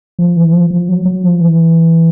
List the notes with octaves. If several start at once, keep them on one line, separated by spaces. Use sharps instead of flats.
F3
E3
F3
F3
F#3
F#3
F3
E3